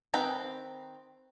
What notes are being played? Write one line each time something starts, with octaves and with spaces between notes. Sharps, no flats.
D#3 C4 B4 G5 A#5